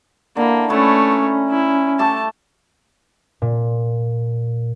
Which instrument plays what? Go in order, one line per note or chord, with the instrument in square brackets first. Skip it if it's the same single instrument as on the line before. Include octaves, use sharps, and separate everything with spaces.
[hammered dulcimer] D3 E4 [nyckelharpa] A#3
[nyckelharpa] A3 C#5 [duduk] C#4 [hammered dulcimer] E4 B4 A5
[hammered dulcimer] A#5
[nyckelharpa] E4
[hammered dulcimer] A3 G4 A4 [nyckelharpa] A5
[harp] A#2